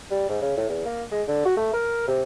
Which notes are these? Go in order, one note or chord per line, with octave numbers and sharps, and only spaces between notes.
G3
G#2
C#3
A2
E2
A#3
G#3
D3
F#4
A3
A#4
C3